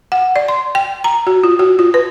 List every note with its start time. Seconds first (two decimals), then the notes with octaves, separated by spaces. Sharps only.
0.12 F#5
0.36 D5
0.48 C6
0.75 G5
1.04 A#5
1.27 F#4
1.44 F4
1.59 F#4
1.79 F4
1.94 B4